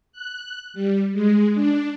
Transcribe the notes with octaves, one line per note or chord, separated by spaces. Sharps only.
F#6
G3
G#3
D4